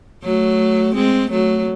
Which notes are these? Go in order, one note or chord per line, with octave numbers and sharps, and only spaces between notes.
F#3 A3
G#3 C4
F#3 A3